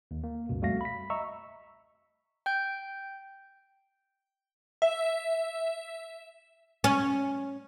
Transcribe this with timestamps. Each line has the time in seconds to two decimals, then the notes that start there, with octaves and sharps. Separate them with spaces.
0.11 D#2
0.24 A#3
0.49 C#2 F#2 B2
0.62 F2 G3 A3 F#4 F5 A#6
0.81 B5 B6
1.10 D#5 E5 A#5 C#6 E6
2.46 G5 G6
4.82 E5
6.84 C#4